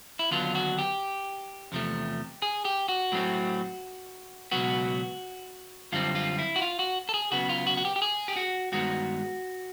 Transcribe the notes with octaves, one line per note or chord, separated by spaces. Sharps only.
E4
D#2 D3 F#3 B3 D4 F4
F#4
G4
E2 C3 F3 A3
G#4
G4
F#4
A2 F#3 A3 C4
C#2 B2 F#3 B3 F#4
F#2 D3 G3 C4 F4
F4
E4
F#4
F4
F#4
A4
G#4
C#3 F#3 B3 F#4
F4
F#4
F#4
G4
G4
G#4
G4
F#4
G2 D#3 G#3 B3 F#4